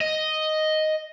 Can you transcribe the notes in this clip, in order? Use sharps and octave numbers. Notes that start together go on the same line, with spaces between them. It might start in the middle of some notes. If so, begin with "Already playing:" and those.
D#5